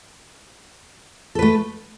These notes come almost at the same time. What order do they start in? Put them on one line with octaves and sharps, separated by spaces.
A4 B4 A3